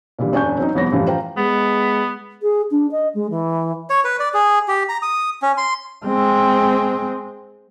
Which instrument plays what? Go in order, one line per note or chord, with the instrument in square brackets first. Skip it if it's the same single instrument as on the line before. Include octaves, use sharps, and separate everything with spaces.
[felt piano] A#2 D3 E3 G3
E1 F#2 D4 G#5 C#6 G6
F#3 C4 C#4 D#4
C2 F2 B3 C#5 A#6
F#2 A2 E3 F3 G3
F4 C5 F5 G5 A#5
[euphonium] G#3 [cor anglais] B3
[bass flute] G#4
D4
D#5
G#3
E3
[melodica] C#5
B4
D5
G#4
G4
A#5
D#6
C#4
C6
[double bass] G#3 C4